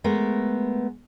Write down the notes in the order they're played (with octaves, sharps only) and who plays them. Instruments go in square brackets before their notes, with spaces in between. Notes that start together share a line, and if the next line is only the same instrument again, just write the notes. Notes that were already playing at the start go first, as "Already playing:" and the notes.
[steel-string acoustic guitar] G#3 A3 B3 A#4